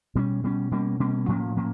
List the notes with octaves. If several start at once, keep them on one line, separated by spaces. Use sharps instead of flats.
B2 G3 A#3 C#4
B2 G3 A#3 C#4
B2 G3 A#3 C#4
B2 G3 A#3 C#4
A2 F3 A#3 C#4
A2 F3 A#3 C#4